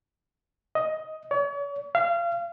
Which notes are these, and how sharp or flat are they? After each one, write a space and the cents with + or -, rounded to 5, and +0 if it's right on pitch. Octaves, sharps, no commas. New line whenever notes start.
D#5 +10
C#5 +40
F5 -30